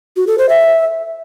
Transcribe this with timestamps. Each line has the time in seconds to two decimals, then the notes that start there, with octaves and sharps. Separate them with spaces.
0.16 F#4
0.27 A4
0.38 C5
0.49 E5